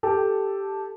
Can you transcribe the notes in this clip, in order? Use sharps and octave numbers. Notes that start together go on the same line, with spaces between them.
G4 A4